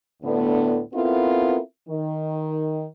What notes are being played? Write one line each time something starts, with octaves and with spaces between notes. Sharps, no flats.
D2 A2 D3 B3
B3 C4 E4 F4 A4 A#4
D#3